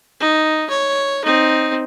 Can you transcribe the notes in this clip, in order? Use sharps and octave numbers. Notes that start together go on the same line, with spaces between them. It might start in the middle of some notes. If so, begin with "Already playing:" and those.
D#4
C#5
C4 D#4